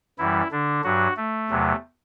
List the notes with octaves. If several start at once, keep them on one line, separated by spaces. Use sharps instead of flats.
F#2 E3 G3 E4
D3 D4
G2 F#3 F#4
A3
E2 C3 F#3